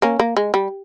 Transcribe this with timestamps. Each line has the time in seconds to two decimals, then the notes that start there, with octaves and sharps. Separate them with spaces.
0.02 A#3 C#4
0.19 A#3
0.37 G#3
0.54 G3